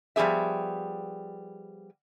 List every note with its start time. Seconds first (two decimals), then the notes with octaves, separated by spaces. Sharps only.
0.16 F3 G3 B3 G#4 E5